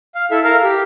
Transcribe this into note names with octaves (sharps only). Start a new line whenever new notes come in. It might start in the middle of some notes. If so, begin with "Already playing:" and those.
F5
E4 A4 E5
A#4 F5
G4